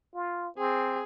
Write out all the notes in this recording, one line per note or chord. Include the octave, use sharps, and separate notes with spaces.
F4
C4 G#4